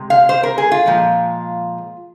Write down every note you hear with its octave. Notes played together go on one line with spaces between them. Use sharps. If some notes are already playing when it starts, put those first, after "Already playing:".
Already playing: C3 G#3
F5
C5
A#4
G#4
F4
A#2 F3 G#3